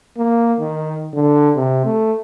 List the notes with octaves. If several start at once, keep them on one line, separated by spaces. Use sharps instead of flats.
A#3
D#3
D3
C3
A3